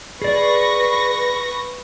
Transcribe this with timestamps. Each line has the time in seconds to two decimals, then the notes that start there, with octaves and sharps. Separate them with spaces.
0.22 G#4 B4 D5 C#6 A#6